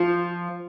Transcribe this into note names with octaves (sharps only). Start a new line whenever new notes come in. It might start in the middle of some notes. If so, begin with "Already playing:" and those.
Already playing: F3